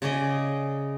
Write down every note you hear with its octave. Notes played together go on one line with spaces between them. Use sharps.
C#3 G#4 D5 D#5